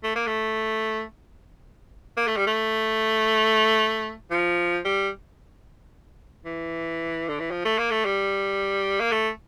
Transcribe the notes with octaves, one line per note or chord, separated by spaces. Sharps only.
A3
A#3
A3
A#3
A3
G3
A3
F3
G3
E3
D3
E3
F3
A3
A#3
A3
G3
A#3
A3